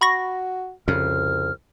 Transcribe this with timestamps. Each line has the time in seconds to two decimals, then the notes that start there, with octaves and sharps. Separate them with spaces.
0.01 F#4 B5 C#6 A#6
0.88 C2 F2 C#3 F6